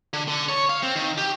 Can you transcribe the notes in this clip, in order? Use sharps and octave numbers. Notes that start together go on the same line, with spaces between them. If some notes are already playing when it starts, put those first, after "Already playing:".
D3
D3
C#5
F5
C4
D#3
G4